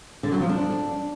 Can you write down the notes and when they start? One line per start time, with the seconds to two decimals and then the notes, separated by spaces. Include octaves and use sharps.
0.23 D3
0.32 F#3
0.41 F3
0.49 D4